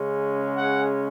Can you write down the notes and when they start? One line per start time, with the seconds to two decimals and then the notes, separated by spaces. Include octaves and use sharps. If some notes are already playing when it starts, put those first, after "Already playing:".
Already playing: C#3 G#3 C#4
0.56 F#5